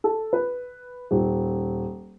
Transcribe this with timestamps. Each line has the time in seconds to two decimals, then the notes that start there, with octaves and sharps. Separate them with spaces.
0.04 A4
0.33 B4
1.11 D#1